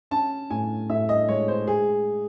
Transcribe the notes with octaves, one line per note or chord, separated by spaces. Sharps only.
C#4 A5
A2 G#5
A2 E5
D#5
G#3 C#5
C5
G#3 G#4